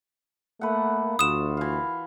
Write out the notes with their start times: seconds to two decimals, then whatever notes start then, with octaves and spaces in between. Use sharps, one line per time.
0.61 A3 A#3 B4 F#5
1.19 D2 F4 F#4 D#6 E7
1.57 E3 F5